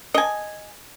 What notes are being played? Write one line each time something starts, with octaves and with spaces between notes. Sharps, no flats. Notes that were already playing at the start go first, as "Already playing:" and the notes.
D#5 G#5